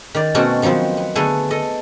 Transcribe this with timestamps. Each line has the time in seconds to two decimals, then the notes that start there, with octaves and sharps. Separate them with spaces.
0.15 D#3 D5
0.35 B2 A3 C4 C#4 F#4 D5
0.62 D#3 F3 F#3 B3 C4
0.97 B3
1.15 D3 A3 B3 G#4 A4 G#5
1.51 A4 D#5